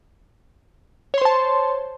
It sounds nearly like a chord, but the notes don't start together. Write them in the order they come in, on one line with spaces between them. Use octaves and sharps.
C#5 C6 C5 A5